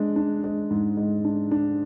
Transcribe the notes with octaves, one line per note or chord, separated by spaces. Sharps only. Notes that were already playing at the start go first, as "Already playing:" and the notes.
Already playing: G#3 D4
D4
G#3
G#2
G#3
D4
D4